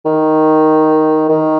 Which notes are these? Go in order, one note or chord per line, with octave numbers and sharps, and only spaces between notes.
D#3
D#3